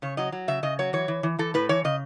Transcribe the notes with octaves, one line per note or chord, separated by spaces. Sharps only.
C#3 C#5
F#3 D#5
F#3
C#3 E5
C#3 D#5
F#3 C#5
E3 C#5
E3
E3
E3 A4
A2 B4
E3 C#5
C#3 D#5